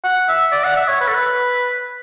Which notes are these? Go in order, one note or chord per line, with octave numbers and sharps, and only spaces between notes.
F#5
E5
D5
F#5
E5
C#5
B4
A4
B4